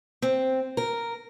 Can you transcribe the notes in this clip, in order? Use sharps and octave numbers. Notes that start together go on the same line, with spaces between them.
C4
A#4